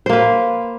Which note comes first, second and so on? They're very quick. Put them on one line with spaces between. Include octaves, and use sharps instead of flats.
C5 A#3 B4